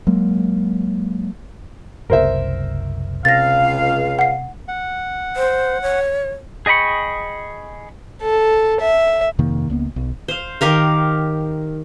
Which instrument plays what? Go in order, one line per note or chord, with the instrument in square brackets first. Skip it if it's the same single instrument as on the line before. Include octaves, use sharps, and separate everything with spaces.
[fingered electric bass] F#3 G#3 A#3
[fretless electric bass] F#1 C2 [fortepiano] A#4 C5 E5
[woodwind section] C#2 F5 [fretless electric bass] C3 [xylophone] A6 A#6
[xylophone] F#5 C7
[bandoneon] F#5
[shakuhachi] C5
C#5
[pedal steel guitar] G#4 D#5 G5 B5 C#6
[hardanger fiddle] A4
E5
[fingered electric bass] F2 C3 D#3 A#3
C#2 A#3 B3
B1
[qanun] C5 F5
D#3 G4 A#4 F5